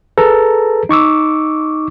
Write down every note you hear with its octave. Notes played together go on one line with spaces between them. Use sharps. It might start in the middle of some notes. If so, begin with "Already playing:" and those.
G#4 A4 B4 A#5
D#4 C#6 D6 E6